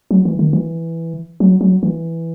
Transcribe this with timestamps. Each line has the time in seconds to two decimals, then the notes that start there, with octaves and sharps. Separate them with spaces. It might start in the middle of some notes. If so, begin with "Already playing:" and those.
0.11 F#3
0.25 E3
0.39 D#3
0.53 E3
1.40 F#3
1.61 F#3
1.83 E3